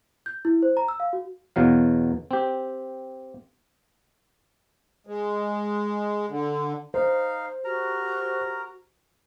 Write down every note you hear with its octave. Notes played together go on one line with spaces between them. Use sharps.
G6
E4
C5
A#5
E6
F5
F#4
E2 B2 F#3 F5
C4 G4
G#3
D3
D#4 C5 F5
F#4 G4 A#4 A#5